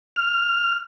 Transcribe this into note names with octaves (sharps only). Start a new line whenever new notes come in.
F6